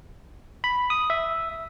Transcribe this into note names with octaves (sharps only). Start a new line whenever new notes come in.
B5
D#6
E5